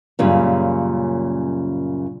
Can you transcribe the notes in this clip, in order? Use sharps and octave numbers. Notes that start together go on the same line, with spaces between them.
F#2 A#2 C#3 G3